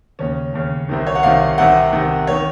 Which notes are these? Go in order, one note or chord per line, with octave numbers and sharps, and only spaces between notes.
D#2 C#3 C#4
D#2 C#3
C2 C3 D#3
C#5
F#5
C2 C3 D#3 F5
C2 C3 D#3 F#5
C2 C3 D#3
D#3 C#5